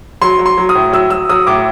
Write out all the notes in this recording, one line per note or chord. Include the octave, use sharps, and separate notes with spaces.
F#3 C6
F#3
C6
F#3
D#6
A2
F#3 E6
F#3 E6
F#3 D#6
A2 D6